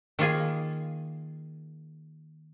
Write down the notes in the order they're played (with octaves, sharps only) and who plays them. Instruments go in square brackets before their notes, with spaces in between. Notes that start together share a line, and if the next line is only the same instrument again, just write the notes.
[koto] D#3 A#3 F4 G#4